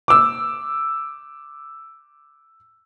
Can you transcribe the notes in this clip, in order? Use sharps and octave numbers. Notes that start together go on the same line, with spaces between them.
D6 E6